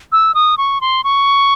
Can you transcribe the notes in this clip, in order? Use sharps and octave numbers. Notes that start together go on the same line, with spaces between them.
E6
D#6
C#6
C6
C#6